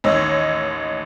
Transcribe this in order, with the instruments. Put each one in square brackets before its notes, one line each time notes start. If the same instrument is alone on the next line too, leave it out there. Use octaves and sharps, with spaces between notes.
[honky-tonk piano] A1 D#2 C#5 D#5 E6